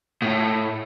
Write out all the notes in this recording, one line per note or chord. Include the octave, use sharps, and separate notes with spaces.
A2